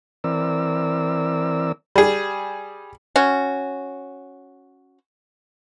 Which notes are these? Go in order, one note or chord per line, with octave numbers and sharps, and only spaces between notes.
E3 C4 A#4 D5 E6
G3 G#4
C#4 F#4